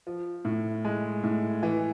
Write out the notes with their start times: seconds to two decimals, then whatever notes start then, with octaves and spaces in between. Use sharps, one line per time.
0.07 F3
0.45 A2
0.85 G#3
1.23 A2
1.63 E3